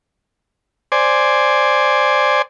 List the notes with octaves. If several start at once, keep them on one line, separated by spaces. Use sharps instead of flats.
C5 D5 G#5